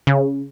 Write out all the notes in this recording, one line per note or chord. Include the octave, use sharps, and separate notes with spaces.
C#3